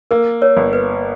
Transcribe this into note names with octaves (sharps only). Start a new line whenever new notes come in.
A#3 A#4
A#4 C#5
G1
B4